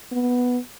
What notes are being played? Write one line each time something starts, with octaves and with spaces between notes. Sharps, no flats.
B3